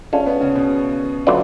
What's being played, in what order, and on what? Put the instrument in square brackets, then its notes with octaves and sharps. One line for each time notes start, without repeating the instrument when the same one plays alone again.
[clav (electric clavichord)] G#3 D4 F4 A4 [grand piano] C#4
[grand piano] B3
C#3
B2
[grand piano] D3 [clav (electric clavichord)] F#3 A3 F4 B4 D5